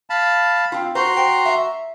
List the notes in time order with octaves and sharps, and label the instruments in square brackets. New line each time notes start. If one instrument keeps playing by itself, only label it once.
[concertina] F5 A5 B5
[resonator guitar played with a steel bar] C4 F4
[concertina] F#4 A#5 C6 [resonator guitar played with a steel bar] C5
[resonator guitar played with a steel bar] C5 G5
E5